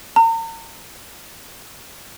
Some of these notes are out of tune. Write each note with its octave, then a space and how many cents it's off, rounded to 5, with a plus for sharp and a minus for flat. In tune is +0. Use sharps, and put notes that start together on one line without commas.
A#5 -40